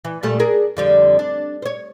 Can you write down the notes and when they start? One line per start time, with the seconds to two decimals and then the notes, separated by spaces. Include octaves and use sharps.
0.05 E3
0.23 A#2 G3 A3
0.39 D4 G#4 A#4
0.77 F2 D3 G3
1.19 D4
1.62 C5 C#5